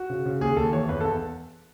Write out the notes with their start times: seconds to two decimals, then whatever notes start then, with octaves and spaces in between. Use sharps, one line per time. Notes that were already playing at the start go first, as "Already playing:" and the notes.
Already playing: F#4
0.10 C#3
0.26 C#3
0.41 D#2 G#4
0.57 D#2 A4
0.73 E3 C#5
0.89 E2 B4
1.00 A4
1.05 E2